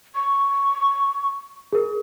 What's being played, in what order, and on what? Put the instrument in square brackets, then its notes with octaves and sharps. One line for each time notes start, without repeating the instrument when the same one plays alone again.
[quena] C#6
[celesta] G#4 A#4